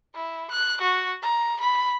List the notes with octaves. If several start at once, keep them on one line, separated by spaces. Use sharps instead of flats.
E4
F#6
F#4
A#5
B5